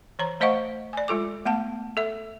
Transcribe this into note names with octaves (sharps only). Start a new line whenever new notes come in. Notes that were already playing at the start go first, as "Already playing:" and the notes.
E3 C#5 A#5
A3 C5 D#5 F5 F#5 C#6
D5 G#5
G#3 F4 A4 D6
A3 B3 F#5 A5
A4 E5